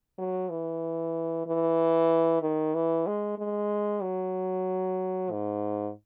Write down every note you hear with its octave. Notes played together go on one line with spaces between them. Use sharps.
F#3
E3
E3
D#3
E3
G#3
G#3
F#3
G#2